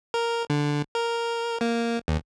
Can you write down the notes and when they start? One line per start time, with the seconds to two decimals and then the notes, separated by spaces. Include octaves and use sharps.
0.14 A#4
0.50 D3
0.95 A#4
1.61 A#3
2.08 D#2